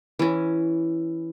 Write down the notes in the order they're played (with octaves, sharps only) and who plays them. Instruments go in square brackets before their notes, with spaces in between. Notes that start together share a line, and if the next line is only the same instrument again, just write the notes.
[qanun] E3 C#4